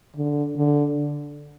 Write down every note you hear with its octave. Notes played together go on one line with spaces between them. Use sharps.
D3
D3